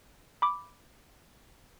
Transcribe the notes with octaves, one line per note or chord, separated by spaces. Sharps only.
B5 D6